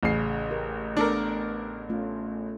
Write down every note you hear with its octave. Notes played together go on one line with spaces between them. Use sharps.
A1 C#3 C7
G4 A#4
A3 B3 D4 A4 A#4
A3 C#4 F4